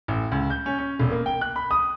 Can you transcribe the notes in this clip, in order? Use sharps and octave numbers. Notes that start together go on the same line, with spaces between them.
A1
C#2
G6
C#4
C#4
E1
A#3
G5
F#6
B5
D#6